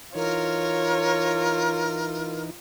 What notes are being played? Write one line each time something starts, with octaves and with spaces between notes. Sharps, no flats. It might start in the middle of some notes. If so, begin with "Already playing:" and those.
E3 D#4 F4 A#4 C#5